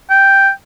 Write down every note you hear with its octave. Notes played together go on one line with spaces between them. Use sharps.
G5